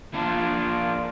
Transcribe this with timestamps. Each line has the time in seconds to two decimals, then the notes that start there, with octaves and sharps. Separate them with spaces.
0.14 A#3 D4 F4